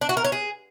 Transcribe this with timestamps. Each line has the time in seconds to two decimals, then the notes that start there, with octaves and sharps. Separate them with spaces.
0.01 D4
0.09 F#4
0.17 A#4
0.25 C#5
0.32 G#4